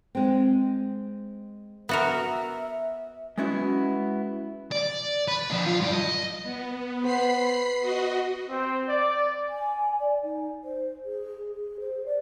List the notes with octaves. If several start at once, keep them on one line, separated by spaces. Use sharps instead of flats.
G#3 C4
B3 F#4 A#4 E5
G#3 B3 C#4 E4 F#4
D5
B4
F3 D4
F4
G2 D5
D#5
B3
B3 C5 B5 C7
F#4 D#5
C4
D5
G#5
D5
D#4
C5
G#4
G#4
C5
D5